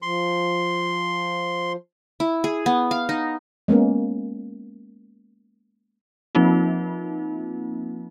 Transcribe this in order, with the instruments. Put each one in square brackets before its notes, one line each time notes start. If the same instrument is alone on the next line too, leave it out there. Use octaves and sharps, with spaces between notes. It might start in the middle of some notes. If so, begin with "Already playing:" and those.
[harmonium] F3 [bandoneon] C6
[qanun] E4
G#4
B3
F5
D#4
[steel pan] G#3 A#3 B3 C#4
[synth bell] F3 A#3 C4 D#4 F4